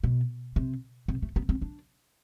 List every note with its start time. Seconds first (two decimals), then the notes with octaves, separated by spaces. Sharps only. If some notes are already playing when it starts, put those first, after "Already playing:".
0.04 B2
0.56 C3
1.08 C3
1.22 A3
1.36 B3
1.49 C4
1.62 D4